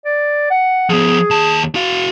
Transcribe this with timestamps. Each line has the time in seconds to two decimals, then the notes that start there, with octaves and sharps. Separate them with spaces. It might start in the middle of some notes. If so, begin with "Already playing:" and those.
0.05 D5
0.50 F#5
0.90 F3 B3 G#4
1.30 D#2 A5
1.75 F#4 F5